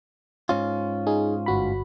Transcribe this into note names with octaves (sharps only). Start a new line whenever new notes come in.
G#2 C#4 F4
D#4 G#4
G1 F#4 B5